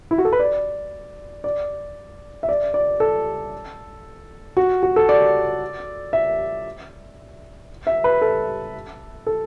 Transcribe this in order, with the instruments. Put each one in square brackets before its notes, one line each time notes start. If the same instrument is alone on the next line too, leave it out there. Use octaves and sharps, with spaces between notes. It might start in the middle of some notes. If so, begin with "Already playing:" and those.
[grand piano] E4
F#4
A4
B4
D5
D5
E5
D5
D5
A4
F#4
F#4
A4
D5
E5
E5
B4
A4
A4